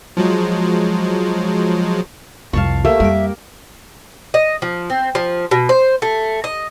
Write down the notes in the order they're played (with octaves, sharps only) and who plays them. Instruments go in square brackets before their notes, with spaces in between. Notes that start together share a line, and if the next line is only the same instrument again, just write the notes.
[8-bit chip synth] F3 F#3 G#3
[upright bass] C2 F2 [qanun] F5 A5 C#6
[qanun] A3 A#3 G4 [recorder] E5
[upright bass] F2 G3 [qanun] A#4 D6
[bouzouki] D#5
F3
C4
F3
B2
C5
A3
D#5